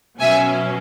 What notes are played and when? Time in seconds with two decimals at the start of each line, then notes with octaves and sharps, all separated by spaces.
0.20 B2 F#3 C#4 E5 G#5